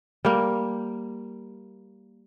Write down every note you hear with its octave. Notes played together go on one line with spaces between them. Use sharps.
G3 A#3